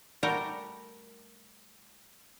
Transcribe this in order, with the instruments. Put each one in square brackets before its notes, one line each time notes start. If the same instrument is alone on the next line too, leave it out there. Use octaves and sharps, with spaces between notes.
[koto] G3 A3 F#4 G4 A#4